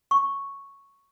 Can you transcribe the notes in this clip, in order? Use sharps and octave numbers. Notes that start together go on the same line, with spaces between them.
C#6